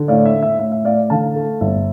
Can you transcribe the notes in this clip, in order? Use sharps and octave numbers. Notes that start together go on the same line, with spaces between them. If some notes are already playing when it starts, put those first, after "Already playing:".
Already playing: D3
A2 D5 F5
E5
A2
E5
A2 E5
E5
A2 D5 F5
D3 F5 A5
A3
G1 E5